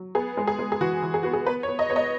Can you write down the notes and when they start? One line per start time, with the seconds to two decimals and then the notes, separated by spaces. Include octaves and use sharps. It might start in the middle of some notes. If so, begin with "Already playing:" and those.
Already playing: F#3
0.15 B3 G#4
0.37 G#3
0.47 G#4
0.59 G#3
0.72 G#4
0.81 E3 F#4
1.03 E3
1.14 G#4
1.23 B3 F#4
1.33 G#4
1.46 B3 B4
1.63 C#5
1.68 B3
1.79 D#5
1.90 B3 C#5
1.96 D#5